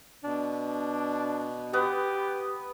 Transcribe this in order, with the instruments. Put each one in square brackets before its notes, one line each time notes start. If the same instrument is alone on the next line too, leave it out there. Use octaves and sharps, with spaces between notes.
[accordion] B2 [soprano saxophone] D4
[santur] B3 B4 F#5 [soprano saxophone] G4